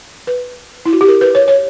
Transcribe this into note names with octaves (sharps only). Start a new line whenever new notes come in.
B4
E4
F#4
G4
A#4
B4
C#5
C#5